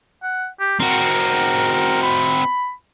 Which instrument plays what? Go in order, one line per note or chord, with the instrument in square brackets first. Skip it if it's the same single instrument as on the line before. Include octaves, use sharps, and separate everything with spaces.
[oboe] F#5
G4
[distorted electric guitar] C4 F#4 [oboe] A#4
[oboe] B5